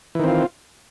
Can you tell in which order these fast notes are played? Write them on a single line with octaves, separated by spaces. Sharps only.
E3 D#3 C4 F4